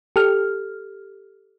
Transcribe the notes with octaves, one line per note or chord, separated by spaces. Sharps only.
G4 A4 F6